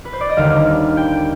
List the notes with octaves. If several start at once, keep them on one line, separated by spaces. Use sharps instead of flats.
B4
C5
D5
D#5
D#2 D3 G3 F5
G5